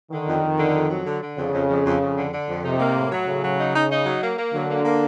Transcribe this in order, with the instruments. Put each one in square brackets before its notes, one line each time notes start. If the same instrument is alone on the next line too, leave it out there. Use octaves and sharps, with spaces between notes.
[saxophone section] D3 [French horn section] D#3
[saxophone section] F2
F2
D3
F2
F#3
D3
D3
[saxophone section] F2 [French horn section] C#3
[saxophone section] F2
F2
F2
F2
D3
D3
F2
[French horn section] C3 [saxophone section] D#4
[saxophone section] A#3
A2
F#3
[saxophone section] A2 [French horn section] C#3
[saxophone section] F#3
D#4
D#4
D#4
F#3
A#3
A#3
[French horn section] D3 [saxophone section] F#3
[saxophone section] A#3
A#3